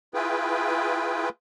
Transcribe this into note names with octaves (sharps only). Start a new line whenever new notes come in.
E4 F4 G#4 B4 G5